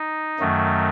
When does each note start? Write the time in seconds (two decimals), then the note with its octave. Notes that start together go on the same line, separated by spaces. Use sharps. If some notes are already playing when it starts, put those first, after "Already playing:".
Already playing: D#4
0.39 F#2 D#3 F#3 A3